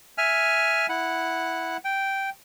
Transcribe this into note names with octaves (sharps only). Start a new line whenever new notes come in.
E5 G#5 F6
E4 F#5
G5